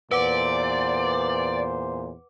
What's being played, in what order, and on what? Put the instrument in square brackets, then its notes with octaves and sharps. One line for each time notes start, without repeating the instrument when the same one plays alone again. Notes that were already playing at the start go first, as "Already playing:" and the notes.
[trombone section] E2 A#2 C5 [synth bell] B4 F#5 D6 [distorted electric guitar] D5